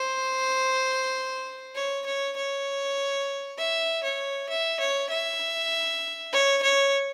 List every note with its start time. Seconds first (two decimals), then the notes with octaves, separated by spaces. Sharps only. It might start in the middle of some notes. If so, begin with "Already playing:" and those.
Already playing: C5
1.75 C#5
2.06 C#5
2.36 C#5
3.58 E5
4.04 C#5
4.49 E5
4.80 C#5
5.10 E5
6.32 C#5
6.62 C#5